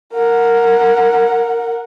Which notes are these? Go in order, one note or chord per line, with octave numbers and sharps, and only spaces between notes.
A#4 F#5